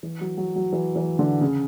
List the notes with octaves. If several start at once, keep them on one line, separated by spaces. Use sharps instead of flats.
E3
F#3
F#3
F#3
E3
E3
D3
C#3